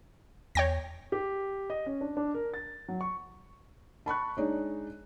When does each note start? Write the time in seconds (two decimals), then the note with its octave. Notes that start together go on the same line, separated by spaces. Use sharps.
0.55 E2 C#5 G5 A#6
1.12 G4
1.70 D#5
1.86 C#4
2.01 D4
2.17 D4
2.34 A#4
2.54 A6
2.88 F#3
3.01 C#6
4.06 A5 B5 C#6 F#6
4.37 G#3 D4 D#4 C#5